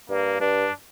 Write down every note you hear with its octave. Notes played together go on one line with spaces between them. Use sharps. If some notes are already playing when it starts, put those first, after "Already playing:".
G2 A#3
G2 D4